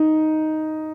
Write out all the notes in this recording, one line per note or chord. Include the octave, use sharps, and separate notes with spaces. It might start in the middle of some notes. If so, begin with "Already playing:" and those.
Already playing: D#4